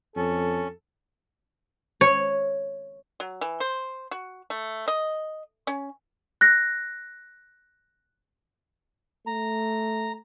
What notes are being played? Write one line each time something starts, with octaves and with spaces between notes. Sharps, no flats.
F2 C#4 A4
C#5
F#3
E3
C5
F#4
A3
D#5
C#4
F#6 A#6
A3 A#5